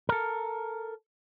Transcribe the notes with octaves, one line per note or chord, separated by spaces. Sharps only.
A4 A#4